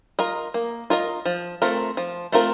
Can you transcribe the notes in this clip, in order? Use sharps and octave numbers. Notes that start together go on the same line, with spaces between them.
F4 A#4 D#5
A#3
F4 A#4 D#5
F3
A3 C4 F4 A#4
F3
A3 C4 F4 A#4